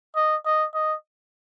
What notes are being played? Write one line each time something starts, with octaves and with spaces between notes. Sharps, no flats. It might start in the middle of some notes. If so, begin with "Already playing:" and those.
D#5
D#5
D#5